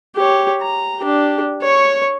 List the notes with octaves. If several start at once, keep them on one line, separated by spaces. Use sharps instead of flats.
G4 C#5
A#5
D4 G4
C#5 C#6